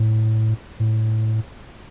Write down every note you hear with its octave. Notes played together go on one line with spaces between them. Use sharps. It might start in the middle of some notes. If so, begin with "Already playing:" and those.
Already playing: A2
A2